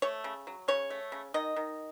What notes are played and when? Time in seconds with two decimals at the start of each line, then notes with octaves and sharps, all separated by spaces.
0.02 A3 C#5
0.24 C#3
0.47 F#3
0.68 C#3 C#5
0.90 A3
1.12 C#3
1.34 D#3 D#5
1.56 D#3